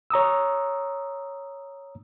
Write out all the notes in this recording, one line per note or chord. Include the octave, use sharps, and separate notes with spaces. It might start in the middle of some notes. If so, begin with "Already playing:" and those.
C#5 A#5 D#6 E6